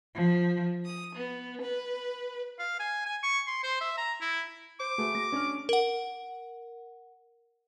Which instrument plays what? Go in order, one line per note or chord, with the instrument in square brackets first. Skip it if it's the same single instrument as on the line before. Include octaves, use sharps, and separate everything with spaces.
[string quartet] F3
D#6
B3
B4
[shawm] F5
G#5
G#5
C#6
C6
C5
E5
A#5
E4
[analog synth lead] C5 [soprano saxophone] D6
[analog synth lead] A3 [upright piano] F#4 G#4 B4
[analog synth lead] A#6
[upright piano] C#4 F6 [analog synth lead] D4
[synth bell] A#4 F#5